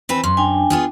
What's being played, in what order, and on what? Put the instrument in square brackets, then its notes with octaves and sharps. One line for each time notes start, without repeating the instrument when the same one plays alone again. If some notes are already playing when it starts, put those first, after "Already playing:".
[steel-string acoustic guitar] E3 C4 B4
[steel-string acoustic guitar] F#2 [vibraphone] C6
[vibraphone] D4 G5 G#5
[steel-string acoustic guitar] B3 F4 G#4